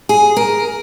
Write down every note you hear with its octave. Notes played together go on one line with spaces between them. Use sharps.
G#4
A#4